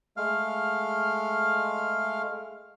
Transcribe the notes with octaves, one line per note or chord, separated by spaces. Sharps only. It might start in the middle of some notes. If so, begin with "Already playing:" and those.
G#3 A3 F5 F6